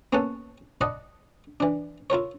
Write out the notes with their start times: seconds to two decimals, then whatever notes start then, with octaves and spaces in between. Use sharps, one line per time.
0.13 A#3 B3 C#4 A4 F#5 A5
0.81 D5 D#5 F#5 A5 B5
1.60 E3 D4
2.10 E4 F4 A#4 C#5